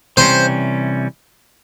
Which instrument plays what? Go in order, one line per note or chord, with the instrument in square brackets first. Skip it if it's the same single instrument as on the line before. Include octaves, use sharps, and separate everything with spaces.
[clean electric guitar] C3 E3 G3 C#4 [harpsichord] C5